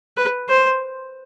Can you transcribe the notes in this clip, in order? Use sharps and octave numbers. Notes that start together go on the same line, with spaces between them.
B4
C5